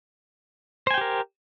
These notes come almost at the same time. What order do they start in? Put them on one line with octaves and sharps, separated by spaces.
C5 G#5 G5 G4 A#4